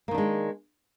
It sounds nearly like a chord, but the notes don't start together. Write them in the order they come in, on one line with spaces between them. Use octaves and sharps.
A#3 D#3 D4 G#3